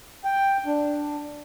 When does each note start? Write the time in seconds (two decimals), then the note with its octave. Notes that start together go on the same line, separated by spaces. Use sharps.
0.24 G5
0.66 D4